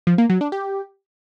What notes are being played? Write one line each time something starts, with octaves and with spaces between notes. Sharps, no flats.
F3
A#3
F#3
D4
G4